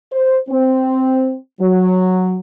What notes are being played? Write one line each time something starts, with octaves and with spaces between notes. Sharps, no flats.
C5
C4
F#3